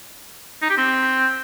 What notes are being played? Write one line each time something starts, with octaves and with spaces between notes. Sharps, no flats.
D#4
G4
C4